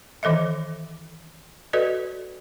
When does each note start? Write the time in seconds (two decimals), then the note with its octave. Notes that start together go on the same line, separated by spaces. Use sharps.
0.23 D#3 E3 A4 D#5 E5
1.73 F#4 A4 B4 D5 D#5